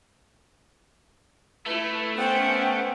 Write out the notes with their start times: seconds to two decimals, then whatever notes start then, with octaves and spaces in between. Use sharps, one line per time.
1.66 A3 E4 B4
2.18 B3 C#4 C5 F#5 G5